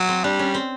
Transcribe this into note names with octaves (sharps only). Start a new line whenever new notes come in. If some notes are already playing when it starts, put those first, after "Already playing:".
Already playing: F#3
C4
G3 D4
C#4
C4